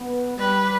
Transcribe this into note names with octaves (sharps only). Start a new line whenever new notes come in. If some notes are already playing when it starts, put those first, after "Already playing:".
Already playing: B3
G3 B4